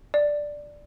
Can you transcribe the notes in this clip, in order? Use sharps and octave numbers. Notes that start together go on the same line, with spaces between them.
D5